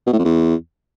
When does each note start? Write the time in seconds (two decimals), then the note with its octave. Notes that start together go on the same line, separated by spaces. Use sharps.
0.07 B2
0.13 A2
0.19 F2
0.25 E2